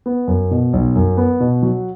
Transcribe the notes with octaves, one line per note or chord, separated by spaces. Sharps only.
B3
F#2
B2
B1
F#2
B3
B2
F#3